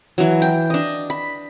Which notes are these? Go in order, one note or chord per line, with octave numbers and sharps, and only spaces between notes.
E3 F#3
G5
D4 D#5
B5